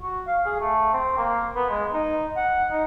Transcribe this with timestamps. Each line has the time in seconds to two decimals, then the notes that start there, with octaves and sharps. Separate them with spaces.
0.02 F#4
0.27 F5
0.46 G#4
0.60 A3
0.93 C4
1.18 A#3
1.56 B3
1.70 G#3
1.93 D#4
2.36 F#5
2.71 D#4